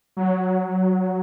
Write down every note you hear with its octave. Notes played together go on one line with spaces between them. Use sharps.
F#3